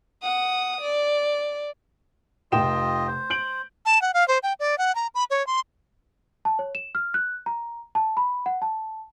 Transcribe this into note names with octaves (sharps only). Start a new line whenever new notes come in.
F#5 D#6
D5
F1 F4 D#5 G5 E7
C5
G6 D7 F#7
A5
F#5
F5
C5
G5
D5
F#5
A#5
B5
C#5
C6
A5
C#5
E7
F6
F#6
A#5
A5
B5
F#5
A5